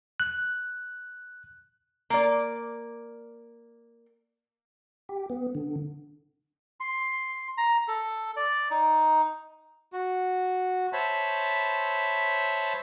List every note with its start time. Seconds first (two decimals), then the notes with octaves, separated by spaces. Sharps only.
0.20 F#6
2.10 A#3 D5
5.09 G4
5.30 B3
5.55 D3
6.80 C6
7.58 A#5
7.88 A4
8.36 D5
8.71 D#4
9.92 F#4
10.93 C5 C#5 E5 A5 B5